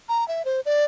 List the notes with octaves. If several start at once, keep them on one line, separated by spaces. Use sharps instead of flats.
A#5
E5
C5
D5